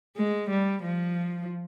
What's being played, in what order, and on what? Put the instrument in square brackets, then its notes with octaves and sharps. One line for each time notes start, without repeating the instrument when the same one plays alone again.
[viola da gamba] G#3
G3
F3